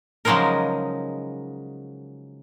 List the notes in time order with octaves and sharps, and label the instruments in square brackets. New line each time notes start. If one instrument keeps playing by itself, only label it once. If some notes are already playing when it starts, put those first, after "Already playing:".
[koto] C#3 F3 F#3 G#3 D#4 A#4